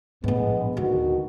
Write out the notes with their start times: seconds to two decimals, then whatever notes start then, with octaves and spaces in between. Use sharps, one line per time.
0.24 A#1 A2 G#3 B3
0.77 D2 B2 D#3 F#4